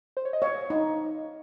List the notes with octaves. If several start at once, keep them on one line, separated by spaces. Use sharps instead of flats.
C5
C#5
D#5
C#5 F5
D#4